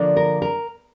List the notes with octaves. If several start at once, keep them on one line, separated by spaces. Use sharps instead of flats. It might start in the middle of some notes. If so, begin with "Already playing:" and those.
Already playing: D3 F3 A#3 D4
A#4
A#4